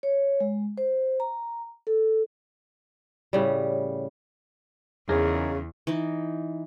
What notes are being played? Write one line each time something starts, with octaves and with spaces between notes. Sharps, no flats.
C#5
G#3
C5
A#5
A4
A2 C#3 G3
E2 C#3 D#4 G#4 A#4
E3 D#4